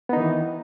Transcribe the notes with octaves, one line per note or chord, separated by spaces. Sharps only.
D#3 E3 B3 D#4